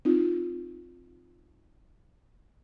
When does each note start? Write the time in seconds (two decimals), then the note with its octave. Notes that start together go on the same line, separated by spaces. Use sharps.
0.05 C4 D#4 F4